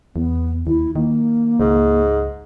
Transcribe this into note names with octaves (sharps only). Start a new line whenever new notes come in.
E2 B3
D#2 E4
D#3 A#3
C#2 G#2